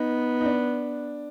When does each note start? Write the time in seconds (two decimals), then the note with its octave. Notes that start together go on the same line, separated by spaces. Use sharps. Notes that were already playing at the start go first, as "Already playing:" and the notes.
Already playing: B3 D#4
0.41 D#4
0.45 D4